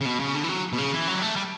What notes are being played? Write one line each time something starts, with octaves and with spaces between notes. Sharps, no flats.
C#3
B2
C#3
D3
E3
F#3
B2
C#3
E3
F#3
G3
A3
G3